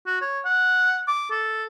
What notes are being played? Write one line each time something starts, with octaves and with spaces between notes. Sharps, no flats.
F#4
C#5
F#5
D6
A4